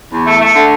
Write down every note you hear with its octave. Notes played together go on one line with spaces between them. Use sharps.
E2
A3
A3
D3